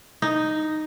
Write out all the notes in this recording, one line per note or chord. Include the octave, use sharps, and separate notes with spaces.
D#4